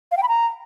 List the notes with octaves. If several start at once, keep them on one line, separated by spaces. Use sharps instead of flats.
F5
G5
B5
A#5